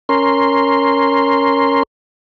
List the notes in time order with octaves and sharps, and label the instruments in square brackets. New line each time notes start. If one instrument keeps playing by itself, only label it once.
[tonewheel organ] C#4 A#4 C6